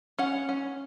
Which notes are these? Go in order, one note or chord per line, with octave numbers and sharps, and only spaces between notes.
C#4 F#5
C#4